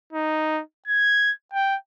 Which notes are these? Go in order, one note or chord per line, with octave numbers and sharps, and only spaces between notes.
D#4
G#6
G5